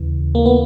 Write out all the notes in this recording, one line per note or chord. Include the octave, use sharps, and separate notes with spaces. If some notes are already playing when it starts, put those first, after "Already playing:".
Already playing: D#2 C#3 E3
A#3
B3